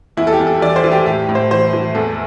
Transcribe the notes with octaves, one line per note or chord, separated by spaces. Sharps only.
E2 E4
A4
G4
E2
A4
E3 D5
C5
E3
G4
A2 G4
A2
C5
E3 C5
E3
E2 A4